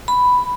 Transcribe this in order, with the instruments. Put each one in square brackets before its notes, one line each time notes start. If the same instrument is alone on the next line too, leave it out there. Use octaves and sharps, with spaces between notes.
[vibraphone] B5